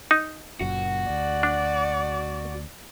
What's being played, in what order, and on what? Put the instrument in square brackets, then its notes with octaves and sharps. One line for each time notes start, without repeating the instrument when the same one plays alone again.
[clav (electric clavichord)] D#4
[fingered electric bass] F#1 F#2 A#2 [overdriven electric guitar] F#4
[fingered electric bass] D2 [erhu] D5
[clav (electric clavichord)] D4